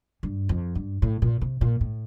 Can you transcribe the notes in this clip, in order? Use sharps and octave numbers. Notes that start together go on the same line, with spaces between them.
G2
F2
G2
A2
A#2
C3
A#2
A2